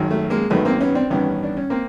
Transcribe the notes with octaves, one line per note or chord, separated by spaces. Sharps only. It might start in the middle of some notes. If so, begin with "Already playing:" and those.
Already playing: G#1 F#2 D#3
A3
G#3 A#3
G#1 F#2 D#3 A3 B3
A#3 C4
B3 C#4
C4 D4
A1 G2 D#3 B3 C#4
D4
C#4
A#3 C4